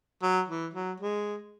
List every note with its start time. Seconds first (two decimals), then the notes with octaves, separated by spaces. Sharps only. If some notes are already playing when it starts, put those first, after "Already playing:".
0.22 F#3
0.48 E3
0.74 F#3
1.00 G#3